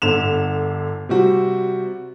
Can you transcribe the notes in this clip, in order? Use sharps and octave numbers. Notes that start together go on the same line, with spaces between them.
G1 D3 E7 F7
C3 G3 F#4